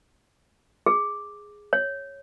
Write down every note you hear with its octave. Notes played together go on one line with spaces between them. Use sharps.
G#4
C#5